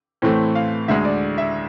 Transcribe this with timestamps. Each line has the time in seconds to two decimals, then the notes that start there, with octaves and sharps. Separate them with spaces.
0.22 A2 E3 A3 C4 C5
0.55 F5
0.88 D2 D3 G#3 E5
1.05 D5
1.38 E5